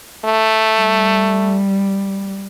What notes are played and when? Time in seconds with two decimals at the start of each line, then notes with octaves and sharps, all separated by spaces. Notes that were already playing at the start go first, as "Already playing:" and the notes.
0.25 A3
0.75 G3